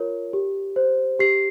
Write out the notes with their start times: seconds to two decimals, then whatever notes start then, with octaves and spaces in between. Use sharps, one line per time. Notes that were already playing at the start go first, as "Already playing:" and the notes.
Already playing: F4 A#4 C#5
0.33 G4
0.76 C5
1.19 G4 C7